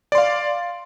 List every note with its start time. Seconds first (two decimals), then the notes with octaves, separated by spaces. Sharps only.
0.12 D5
0.15 C6
0.18 F5